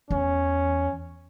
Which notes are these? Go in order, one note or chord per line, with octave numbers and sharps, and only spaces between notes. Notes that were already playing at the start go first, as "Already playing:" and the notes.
E2 C#4